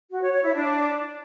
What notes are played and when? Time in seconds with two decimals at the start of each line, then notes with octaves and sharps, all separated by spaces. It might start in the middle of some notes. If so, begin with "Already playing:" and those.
0.11 F#4
0.22 C#5
0.33 C#5
0.44 E4
0.54 D4